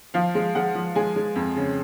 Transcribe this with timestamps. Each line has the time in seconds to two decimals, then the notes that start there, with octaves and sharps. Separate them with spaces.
0.14 F3 F5
0.35 G#3
0.55 G#3 F#5
0.75 F3
0.96 G#3 G#5
1.16 G#3
1.35 F2
1.56 C#3